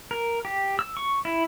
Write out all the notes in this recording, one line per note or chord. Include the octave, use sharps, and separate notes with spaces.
A#4
G4
E6
C#6
E4